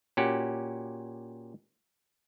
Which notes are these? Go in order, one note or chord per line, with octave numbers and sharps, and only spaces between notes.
A#2 C#4 F#4 G4 F#5